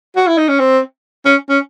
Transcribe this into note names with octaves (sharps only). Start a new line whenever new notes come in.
F#4
E4
D#4
C#4
C4
C#4
C#4